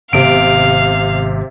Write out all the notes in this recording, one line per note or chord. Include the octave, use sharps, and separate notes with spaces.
G#1 C3 B3 F5 D7